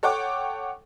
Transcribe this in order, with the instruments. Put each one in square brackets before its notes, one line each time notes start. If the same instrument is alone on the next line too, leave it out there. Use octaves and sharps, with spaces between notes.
[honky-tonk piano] A4 C#5 F#5 G5 D6